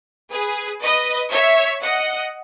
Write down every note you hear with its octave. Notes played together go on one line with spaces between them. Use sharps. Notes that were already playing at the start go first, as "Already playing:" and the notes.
G#4 B4
B4 D#5
C#5 E5
D#5 F#5